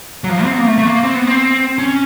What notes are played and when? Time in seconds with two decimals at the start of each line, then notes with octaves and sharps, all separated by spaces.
0.24 F#3
0.29 F3
0.43 C4
0.51 B3
0.59 A#3
0.66 A3
0.78 A3
0.85 A#3
1.03 C4
1.15 B3
1.27 C4
1.78 C#4